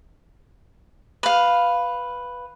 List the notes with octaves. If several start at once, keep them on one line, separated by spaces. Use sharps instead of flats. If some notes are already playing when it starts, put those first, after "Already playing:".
B4 F5